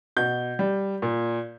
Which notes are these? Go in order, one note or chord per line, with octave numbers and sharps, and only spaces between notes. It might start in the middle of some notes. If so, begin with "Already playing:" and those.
B2 G6
G3
A#2